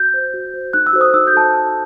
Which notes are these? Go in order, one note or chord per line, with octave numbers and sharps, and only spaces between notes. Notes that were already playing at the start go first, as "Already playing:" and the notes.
Already playing: F#4 G6
C5
F#4
C5
D#4 F#6
E6
F#4 A4 C5
D#6
D#4 E6
G6
F#4 A4 C5 A5